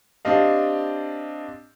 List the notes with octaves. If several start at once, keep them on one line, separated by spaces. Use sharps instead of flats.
C4 D4 G4 D#5 F5